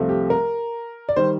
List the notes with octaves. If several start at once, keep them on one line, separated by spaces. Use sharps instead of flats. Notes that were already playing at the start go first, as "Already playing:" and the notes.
Already playing: C2 C3 F3 A3
G4
A#4
D5
D#3 G3 C5